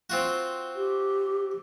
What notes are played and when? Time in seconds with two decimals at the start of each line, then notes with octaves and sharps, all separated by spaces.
0.10 C4 F4 F#4
0.75 G4